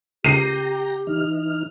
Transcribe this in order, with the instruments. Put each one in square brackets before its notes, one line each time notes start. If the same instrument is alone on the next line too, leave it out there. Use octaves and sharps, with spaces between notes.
[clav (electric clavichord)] C#2 [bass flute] G4 [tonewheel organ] G5 A#5 [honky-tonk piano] C7 D#7
[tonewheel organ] E3 D#4 F6